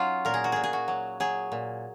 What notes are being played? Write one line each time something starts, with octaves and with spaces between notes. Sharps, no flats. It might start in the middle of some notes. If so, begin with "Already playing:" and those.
Already playing: F#3 C#4 D#4 F4
A#2 A#4
G#4
F#4
A#2 G#4
G#4
F#4
F#3
F#3 G#4
A#2